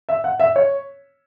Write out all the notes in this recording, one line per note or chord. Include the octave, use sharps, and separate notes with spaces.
E5
F#5
E5
C#5